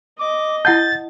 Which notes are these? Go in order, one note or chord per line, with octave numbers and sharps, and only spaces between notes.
D#5 D6
E4 F#5 A5 G6 A6